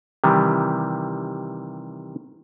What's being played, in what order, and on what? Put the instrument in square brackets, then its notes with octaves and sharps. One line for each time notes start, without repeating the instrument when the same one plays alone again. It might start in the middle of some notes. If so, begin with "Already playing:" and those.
[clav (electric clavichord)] C3 D#3 E3 G3